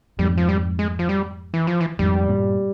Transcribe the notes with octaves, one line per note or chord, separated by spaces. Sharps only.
F2 G#2 G3
F3
G3
G#3
F3
G3
E3
F3
E3
F2 G#2 G3
G2 A#2